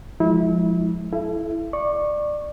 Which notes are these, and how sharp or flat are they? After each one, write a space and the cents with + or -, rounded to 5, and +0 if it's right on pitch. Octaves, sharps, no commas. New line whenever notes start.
F3 +10 G#3 +0 E4 -30
E4 +0 A4 -30 E5 +40
D5 +20 C#6 -10